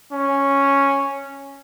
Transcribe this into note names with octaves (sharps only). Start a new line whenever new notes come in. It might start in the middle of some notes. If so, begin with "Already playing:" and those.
C#4